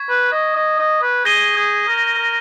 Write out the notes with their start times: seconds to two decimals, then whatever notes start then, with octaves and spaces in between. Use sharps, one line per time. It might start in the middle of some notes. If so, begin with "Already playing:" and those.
Already playing: C#6 G#6 B6
0.09 B4
0.32 D#5
0.56 D#5
0.79 D#5
1.02 B4
1.25 G#4 G6 A#6 D#7 G7
1.56 G#4
1.88 A#4
2.18 A#4